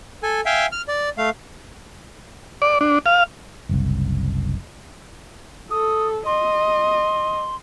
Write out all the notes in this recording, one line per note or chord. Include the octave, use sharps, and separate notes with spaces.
A4 G#5
E5 F5 G5 G#5
F6
D5
A3 F5
D5
D4
F5
F#1 C2
A4 D#6
D#5 C6